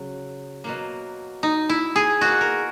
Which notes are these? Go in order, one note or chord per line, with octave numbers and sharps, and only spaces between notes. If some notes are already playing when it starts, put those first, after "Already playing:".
Already playing: C#3 F#3
B2 F#3 A#3
D#4
E4
G#4
B2 A#3 F#4
A#4